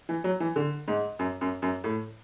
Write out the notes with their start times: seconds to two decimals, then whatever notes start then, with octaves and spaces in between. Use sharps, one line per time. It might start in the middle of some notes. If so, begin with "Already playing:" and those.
0.09 E3
0.24 F#3
0.40 E3
0.56 D3
0.88 G#2
1.19 F#2
1.41 F#2
1.62 F#2
1.84 A2